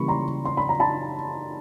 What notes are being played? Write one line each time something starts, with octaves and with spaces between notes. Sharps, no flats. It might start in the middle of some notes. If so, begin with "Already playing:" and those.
Already playing: C#3 E3 G3 A#3 B5 C#6
A#5 C6
C6
B5
A#5
A5 B5